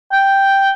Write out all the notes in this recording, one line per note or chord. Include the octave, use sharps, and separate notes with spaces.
G5